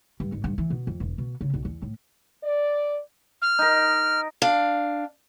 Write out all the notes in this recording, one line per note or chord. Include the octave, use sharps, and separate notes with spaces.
G2
G#1
G2
E3
B2
F2
E1
B2
C#3
B1
E2
A2
D5
F6
D#4 A#4
D4 F5